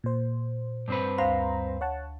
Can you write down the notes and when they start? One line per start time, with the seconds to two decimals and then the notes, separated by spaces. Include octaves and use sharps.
0.04 A#2 C5
0.88 G2 C4 B4
1.18 D2 C5 F5 A#5 C6
1.81 C#5 F#5 A5